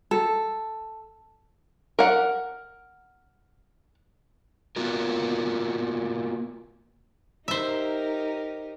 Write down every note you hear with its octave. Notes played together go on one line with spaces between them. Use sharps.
A4
A#4 F#5
A#3 B3 F4 F#4 A#4
D#4 G4 A#4 C5 E5